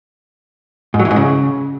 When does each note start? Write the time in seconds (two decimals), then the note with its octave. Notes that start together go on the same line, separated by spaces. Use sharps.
0.94 G#2
1.00 F#3
1.05 E3
1.11 G#2
1.16 C#3